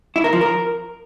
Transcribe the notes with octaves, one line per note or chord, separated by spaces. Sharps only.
E4
A#4
F3
A#4